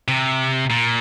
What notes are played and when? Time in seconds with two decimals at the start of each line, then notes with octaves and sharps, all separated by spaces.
0.08 C3
0.70 A#2